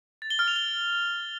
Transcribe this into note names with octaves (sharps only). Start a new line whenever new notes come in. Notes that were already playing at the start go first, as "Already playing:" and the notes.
A6
G7
F6
F7
G7